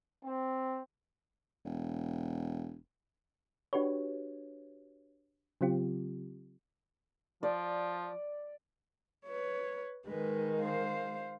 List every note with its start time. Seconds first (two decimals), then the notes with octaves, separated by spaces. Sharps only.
0.25 C4
1.65 E1
3.73 D4 F#4 G4 B4 C#5
5.61 C#3 F#3 C4 F4 G4
7.43 F3 D5
9.26 B4 C#5
10.07 D#3 G#3 B4
10.60 C5 F5